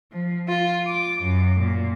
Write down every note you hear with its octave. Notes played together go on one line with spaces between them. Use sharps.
F3
F4
D6
F#2
A#2